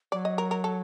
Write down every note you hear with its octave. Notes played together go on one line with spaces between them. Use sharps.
F#3 D5
D#5
A#4
A#4
A4